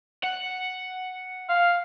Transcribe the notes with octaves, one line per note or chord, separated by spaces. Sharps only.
F#5
F5